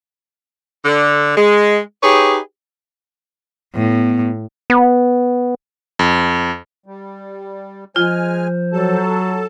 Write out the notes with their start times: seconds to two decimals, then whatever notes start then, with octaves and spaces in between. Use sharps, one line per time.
0.85 D3
1.37 G#3
2.03 D#4 G4 G#4 B4 C#5
3.74 A2 B3
4.70 B3
5.99 F2
6.86 G3
7.96 F3 G#3 F4 C5 G#5 F6
8.73 F#3 A4 A5